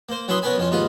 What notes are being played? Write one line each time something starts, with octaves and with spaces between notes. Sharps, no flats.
A#3 C5
F#3 C#4 E4 B4 C6 D#6
B3 C#4 A#4 B4 G#5 B5
F2 C#4 F4
D#2 G#2 F4 B4 D#6